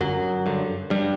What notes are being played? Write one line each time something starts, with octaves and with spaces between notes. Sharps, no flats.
G1 F#2 F#3
G2 D3
G2 G3